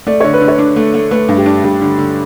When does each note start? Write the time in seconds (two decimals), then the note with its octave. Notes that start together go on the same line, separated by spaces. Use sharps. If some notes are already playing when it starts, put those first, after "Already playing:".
0.07 A3 D5
0.20 D3 C#5
0.34 B4
0.41 D3
0.48 C#5
0.59 D4
0.76 A3
0.94 A3
1.11 A3 B4
1.29 G2
1.37 G4
1.46 D4
1.64 G2 G4
1.81 D3
1.99 D3